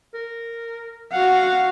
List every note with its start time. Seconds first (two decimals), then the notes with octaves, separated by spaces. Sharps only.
0.14 A#4
1.12 F#4 F5 F#5